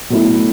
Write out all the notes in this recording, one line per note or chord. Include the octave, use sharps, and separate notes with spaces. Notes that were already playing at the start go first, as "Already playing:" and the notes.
B2 F#3 A3 E4